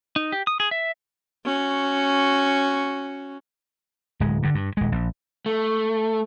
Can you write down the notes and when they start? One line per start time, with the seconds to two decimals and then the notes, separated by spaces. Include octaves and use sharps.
0.16 D#4
0.32 G4
0.47 D#6
0.60 G#4
0.71 E5
1.45 C#4 F#4
4.20 D1 G#3
4.43 G2 D3
4.55 G2
4.77 D#1 G#3
4.92 A#1
5.46 A3